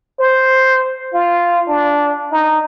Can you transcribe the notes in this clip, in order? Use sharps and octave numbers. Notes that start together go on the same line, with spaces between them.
C5
F4
D4
D#4